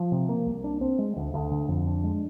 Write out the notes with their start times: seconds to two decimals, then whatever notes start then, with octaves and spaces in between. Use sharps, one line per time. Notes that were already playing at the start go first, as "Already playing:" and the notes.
Already playing: F3
0.12 C3
0.29 A#3
0.46 C2
0.64 D4
0.81 C4
0.99 G#3
1.17 D2
1.34 D2
1.51 D3
1.68 F2
1.87 D4
2.04 G#3